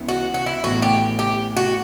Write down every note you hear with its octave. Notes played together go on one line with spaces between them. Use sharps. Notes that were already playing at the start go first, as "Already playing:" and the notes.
Already playing: C#2 C#3 E3 B3 E4
F#4
F#4
E4
A1 A2 E3 B3 F#4
G4
G4
F#4